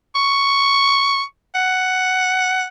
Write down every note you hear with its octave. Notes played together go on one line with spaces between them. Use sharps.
C#6
F#5